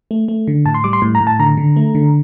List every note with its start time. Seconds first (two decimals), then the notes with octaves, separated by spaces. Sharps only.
0.11 A3
0.28 A3
0.48 D3
0.66 A2 A5
0.74 C6
0.84 G3 D6
0.93 C6
1.02 A2
1.15 A#5
1.20 A2
1.27 A5
1.39 D3 A#5
1.57 D3
1.76 A3
1.95 D3